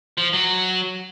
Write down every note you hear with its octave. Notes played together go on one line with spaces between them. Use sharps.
F3
F#3